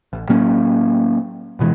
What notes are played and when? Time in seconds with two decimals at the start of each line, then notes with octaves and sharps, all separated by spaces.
0.13 A1
0.29 A2 F#3 A#3 C#4
1.59 D1 B2 E3 G#3